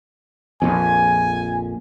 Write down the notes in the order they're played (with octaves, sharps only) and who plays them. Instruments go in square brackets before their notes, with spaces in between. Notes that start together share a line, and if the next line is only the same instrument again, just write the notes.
[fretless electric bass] A#1 F2 [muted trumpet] G#5